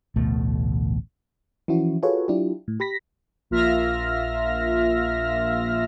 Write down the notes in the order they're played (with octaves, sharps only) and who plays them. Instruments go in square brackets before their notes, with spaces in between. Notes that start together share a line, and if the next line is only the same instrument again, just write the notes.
[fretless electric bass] A1 D2 B2 A3
[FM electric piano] E3 F3 C#4 E4 F#4
F4 F#4 G#4 A4 B4 C#5
F#3 D4 E4 F4 G4
A2
G4 B5 A#6 B6
[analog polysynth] A#1 A#3 F4 E5 F6 A#6